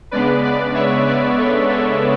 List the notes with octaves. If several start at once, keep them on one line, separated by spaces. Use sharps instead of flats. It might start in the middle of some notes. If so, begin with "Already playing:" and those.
C#3 G#3 B3 D4 B4 D5
B4 D5
C#5 E5
B4 D5
A4 C#5
A4 C#5